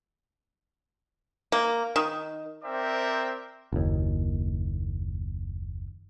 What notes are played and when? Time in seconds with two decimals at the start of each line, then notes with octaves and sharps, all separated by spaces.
1.52 A#3
1.96 D#3
2.64 C4 A#4 C5 D5 E5 G5
3.72 F#1 D#2